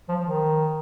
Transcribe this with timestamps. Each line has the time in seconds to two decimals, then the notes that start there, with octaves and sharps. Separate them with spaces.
0.09 F3
0.25 D#3